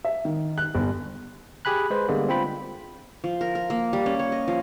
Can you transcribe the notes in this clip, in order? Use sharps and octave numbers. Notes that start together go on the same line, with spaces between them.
E5
D#3
F#6
G1
G4 G#4 G#5 B5 F#6
G#3 B4 C5
D3 G3 G#3 A#3 B3
C4 F4 G5 B5
F3
A#4
A#4
A#3
G3
C#4
C#5
D#5
F3